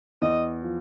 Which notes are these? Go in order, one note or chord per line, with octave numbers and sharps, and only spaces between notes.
E2 D#5
F3